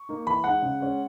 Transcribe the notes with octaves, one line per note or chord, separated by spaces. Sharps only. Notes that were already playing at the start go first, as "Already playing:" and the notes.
Already playing: C#6
A#3 D#4
E3 B5
G#3 D#4 F#5
C#3
G#3 C#4